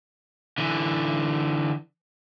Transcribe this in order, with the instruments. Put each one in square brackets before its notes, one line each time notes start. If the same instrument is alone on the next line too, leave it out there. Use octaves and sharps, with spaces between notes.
[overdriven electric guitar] D3 E3